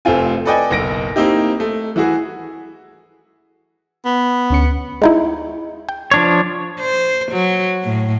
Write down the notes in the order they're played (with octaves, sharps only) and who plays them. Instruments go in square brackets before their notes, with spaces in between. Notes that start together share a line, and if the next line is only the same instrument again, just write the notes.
[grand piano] F1 A3 C4 F4 G#5
A4 B4 D5 D#5 G5 G#5
F#1 B1 A#6 D7
A#3 C4 D#4 E4 G4
A3
E3 E4 F#4 G#4
[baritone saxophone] B3
[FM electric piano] D2 C#4 C#7
[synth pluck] G#3 D#4 E4
G5
[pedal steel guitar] F3 D4 C#5
[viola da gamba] C5
F#3
A2